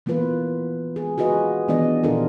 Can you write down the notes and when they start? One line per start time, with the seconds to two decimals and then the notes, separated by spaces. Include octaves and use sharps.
0.06 E3 A#3 B3 F4 B4
0.96 G#4
1.18 F4 F#4 G#4 B4 D#5
1.68 D#3 E3 B3 D4 D5 D#5
2.03 A#2 D#3 D4 F4 A4 A#4